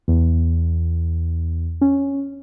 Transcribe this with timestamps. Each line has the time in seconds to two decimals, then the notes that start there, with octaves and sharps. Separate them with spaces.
0.08 E2
1.81 C#4